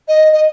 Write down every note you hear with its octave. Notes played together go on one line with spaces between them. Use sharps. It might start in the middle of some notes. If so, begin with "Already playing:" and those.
D#5
D#5